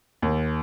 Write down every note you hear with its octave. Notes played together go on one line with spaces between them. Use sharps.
D#2